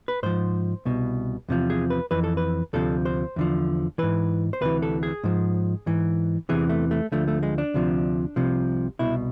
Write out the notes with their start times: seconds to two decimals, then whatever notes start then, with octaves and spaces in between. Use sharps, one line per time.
0.08 B4
0.23 G#2 F3 C5
0.85 C2 B2
1.48 E2 C3 F3
1.70 G#4
1.90 B4
2.11 F2 E3 B4
2.24 A4
2.37 B4
2.73 D2 C3 F3 A4
3.05 C5
3.36 E2 D3 F3
3.98 G#2 E3 B4
4.53 C5
4.61 D2 C3 E3 B4
4.82 A4
5.03 G#4
5.24 G#2 F3
5.86 G#2 E3
6.49 E2 C3 E3 G#4
6.69 A3
6.91 A3
7.12 D2 D3 F3 A3
7.28 A3
7.43 G#3
7.58 D4
7.74 D2 C3 F3
8.36 C2 C3 F3
8.99 C2 B2 E4